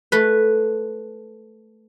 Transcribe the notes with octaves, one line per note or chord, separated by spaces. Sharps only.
A3 B4